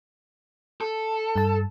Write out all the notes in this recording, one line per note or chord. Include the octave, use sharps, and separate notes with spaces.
A4
G2 A5